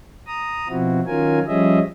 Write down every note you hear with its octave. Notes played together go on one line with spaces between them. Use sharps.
A#5 D#6
B2 F3 C4 E4 F#4
D#3 F#3 C#4 F4 A#4 G#5
F3 G3 C#4 G#4 D#5 E5